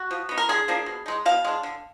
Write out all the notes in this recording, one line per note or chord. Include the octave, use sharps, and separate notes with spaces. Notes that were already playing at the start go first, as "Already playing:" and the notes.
Already playing: F#4
F3
B3 D#4
A#4
D3 G#4
F3 A#3 D4
B2
G#3 D#4
B2 F5
G#3 D4
D3